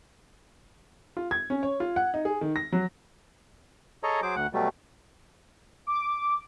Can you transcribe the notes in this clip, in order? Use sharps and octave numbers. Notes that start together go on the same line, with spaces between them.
F4
G#6
C#4
C#5
F4
F#5
D#4
G#4
D#3
A#6
F#3
G#4 A4 C#5 D#5 A#5
F#3 G#4 C5 D6
D2 F#5
B2 F#3 G3 A3
D6